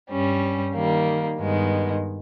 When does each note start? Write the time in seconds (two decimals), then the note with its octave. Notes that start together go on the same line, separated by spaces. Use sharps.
0.10 G2 G3 C#4
0.75 D#3 G3 A#3
1.38 G2 D#3 G#3 B3